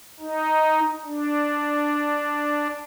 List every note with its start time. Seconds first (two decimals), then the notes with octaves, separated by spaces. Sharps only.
0.20 D#4
1.05 D4